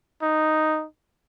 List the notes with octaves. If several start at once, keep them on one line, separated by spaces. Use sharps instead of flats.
D#4